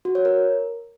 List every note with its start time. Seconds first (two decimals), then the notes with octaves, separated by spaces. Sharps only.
0.05 F#4
0.15 C#5
0.25 A#4